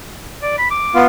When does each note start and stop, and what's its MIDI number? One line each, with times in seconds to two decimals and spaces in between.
0.42 0.57 74
0.58 0.68 83
0.71 1.02 86
0.95 1.07 59
0.95 1.07 65